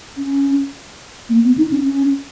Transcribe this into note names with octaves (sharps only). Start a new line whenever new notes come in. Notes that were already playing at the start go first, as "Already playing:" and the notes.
C#4
A#3
B3
D#4
C#4
C#4